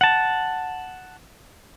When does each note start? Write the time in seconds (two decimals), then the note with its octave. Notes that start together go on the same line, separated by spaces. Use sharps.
0.01 F#5 A5